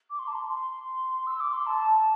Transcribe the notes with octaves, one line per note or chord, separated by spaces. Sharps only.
D6
C6
A5
C6
C6
E6
D6
C6
A5